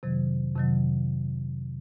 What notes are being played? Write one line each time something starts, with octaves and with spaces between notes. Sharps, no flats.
F2 C3 D#3 F#3
F2 C3 D#3 F#3